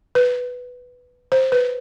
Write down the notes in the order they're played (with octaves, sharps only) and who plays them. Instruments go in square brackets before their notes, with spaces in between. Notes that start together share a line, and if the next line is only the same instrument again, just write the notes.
[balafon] B4
C5
B4